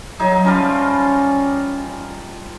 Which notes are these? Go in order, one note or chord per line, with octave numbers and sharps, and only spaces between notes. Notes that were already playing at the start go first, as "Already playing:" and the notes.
F#3 D#4 G#4 E5
F3 G3 C#4 F4